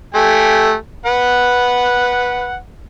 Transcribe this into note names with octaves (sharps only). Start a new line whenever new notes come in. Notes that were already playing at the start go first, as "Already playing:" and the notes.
A3 G4 G#5
B4 F#5